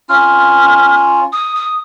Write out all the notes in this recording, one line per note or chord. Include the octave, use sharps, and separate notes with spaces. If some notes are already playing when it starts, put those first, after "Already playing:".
C#4 F4 F6
D#6
D#6